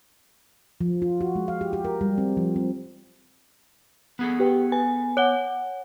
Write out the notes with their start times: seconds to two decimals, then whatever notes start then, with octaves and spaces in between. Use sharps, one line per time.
0.81 F3
1.02 F4
1.21 F#4
1.35 G#3
1.48 F5
1.61 G4
1.73 G4
1.85 A#4
2.01 G3
2.18 C4
2.37 F3
2.56 C4
4.19 B3 G#4 A4
4.40 G4 B4 G5
4.72 B4 G#5
5.17 C#5 F#5 F#6 G7